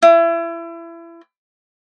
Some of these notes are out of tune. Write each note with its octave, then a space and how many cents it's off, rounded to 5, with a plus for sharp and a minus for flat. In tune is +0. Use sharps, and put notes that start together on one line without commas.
E4 +30